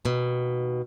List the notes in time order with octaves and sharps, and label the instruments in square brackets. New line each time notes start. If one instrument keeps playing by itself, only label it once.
[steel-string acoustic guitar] D#2 B2